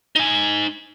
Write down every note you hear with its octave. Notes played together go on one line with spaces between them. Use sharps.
D#4 G#5